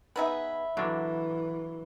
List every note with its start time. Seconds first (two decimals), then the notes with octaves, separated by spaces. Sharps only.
0.16 B3 D#4 G#4 B4 E5
0.77 D3 E3 F#3 A#3 D4